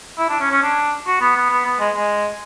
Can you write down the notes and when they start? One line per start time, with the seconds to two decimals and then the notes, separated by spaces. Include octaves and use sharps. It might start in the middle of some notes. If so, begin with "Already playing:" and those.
0.18 E4
0.29 D4
0.40 C#4
0.51 C#4
0.62 D4
1.07 F#4
1.21 B3
1.36 B3
1.50 B3
1.65 B3
1.80 G#3
1.95 G#3